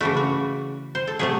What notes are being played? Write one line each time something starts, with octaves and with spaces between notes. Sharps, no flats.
C#3 E3 A3 F#4
F#4
C5
A4
C3 F#3 A3 G#4